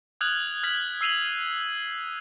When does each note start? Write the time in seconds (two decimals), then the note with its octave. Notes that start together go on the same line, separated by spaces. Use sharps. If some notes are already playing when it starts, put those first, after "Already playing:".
0.21 D#6 F6 F#6 G#6 F7 F#7
0.63 F6 G#6 B6 F#7
1.01 E6 C7 D#7 F7 F#7